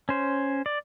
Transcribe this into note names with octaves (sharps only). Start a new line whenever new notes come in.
C#4 C5
D5